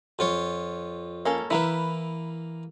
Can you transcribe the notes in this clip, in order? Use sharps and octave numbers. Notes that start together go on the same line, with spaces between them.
F2 F4 C#5
A#3 C#4 A4
E3 A#3 E4 A#4 B4